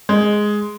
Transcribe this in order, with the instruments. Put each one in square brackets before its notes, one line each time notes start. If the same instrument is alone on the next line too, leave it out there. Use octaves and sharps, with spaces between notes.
[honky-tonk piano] G#3